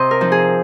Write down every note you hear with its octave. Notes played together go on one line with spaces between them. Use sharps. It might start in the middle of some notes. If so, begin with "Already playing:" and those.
Already playing: C3 C5 D#5
A#4
F3 C4 D#4
G#4